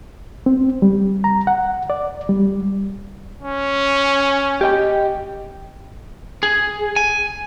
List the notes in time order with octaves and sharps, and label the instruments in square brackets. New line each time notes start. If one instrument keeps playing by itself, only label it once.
[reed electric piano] C4
G3
A#5
F#5
D5
G3
[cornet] C#4
[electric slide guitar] G4 D#5 G5
[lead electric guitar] G#4
G#5